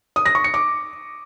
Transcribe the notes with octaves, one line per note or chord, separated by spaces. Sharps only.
D#6
A#6
C#6
C#7
D6